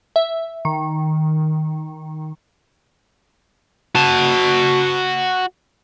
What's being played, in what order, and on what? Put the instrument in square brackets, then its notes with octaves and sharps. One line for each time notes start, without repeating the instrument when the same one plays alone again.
[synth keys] E5
D#3
[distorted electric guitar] F#4 A5